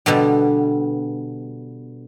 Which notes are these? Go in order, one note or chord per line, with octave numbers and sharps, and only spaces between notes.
B2 D3 G3